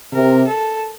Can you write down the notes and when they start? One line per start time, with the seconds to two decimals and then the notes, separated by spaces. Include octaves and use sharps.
0.13 C3 A#4
0.48 A4